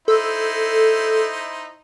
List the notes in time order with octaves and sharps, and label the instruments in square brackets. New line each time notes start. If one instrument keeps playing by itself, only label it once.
[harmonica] D#4 E4 C5 [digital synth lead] A4